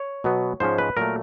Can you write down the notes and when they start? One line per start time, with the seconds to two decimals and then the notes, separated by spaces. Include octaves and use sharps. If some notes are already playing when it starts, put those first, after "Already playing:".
Already playing: C#5
0.24 B2 F#3 B3
0.60 G#2 F3 G#3 C#4 C5
0.78 B4
0.97 A#2 F#3 A3 A#4